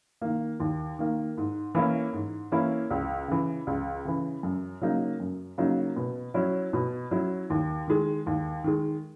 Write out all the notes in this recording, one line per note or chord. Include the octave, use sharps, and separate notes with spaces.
D#3 A#3
D#2
D#3 A#3
G#2
E3 A#3 C#4 E4
G#2
E3 A#3 C#4 E4
C#2
C#3 E3
C#2
C#3 E3
F#2
C#3 F#3 A#3 D#4
F#2
C#3 F#3 A#3 D#4
B2
F#3 C#4 E4
B2
F#3 C#4 E4
D#2
D#3 G#3
D#2
D#3 G#3